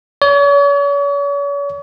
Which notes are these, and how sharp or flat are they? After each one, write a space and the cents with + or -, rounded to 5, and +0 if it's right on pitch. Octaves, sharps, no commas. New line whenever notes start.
C#5 +40